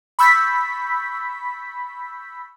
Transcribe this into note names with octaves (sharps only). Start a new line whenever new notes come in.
B5 C#6 E6 G6 A6 B6